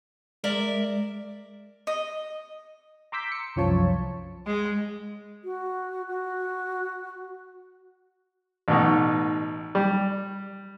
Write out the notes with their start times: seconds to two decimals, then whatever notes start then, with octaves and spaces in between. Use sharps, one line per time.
0.44 G#3 A#4 D5 E5
1.87 D#5
3.12 A#5 C6 D6 E6 G6 B6
3.32 C#7
3.56 C2 F#2 F3 F4 C#5 A5
4.46 G#3
5.44 F#4
6.07 F#4
8.68 A1 B2 D#4
9.75 G3